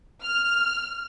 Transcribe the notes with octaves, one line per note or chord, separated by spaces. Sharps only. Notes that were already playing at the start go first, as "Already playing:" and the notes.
F6